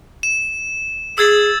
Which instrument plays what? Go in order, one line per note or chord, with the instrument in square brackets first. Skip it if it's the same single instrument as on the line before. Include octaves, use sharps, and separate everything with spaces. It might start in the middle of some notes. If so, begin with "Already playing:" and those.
[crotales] E7
[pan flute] G#4 [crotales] E6 G#6 A6